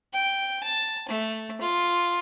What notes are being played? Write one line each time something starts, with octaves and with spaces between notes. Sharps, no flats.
G5
A5
A3
F4